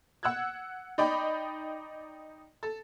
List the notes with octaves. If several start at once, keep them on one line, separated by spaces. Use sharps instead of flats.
F#5 E6 F#6 G#6
D#4 D5 D#5 G5 B5
A4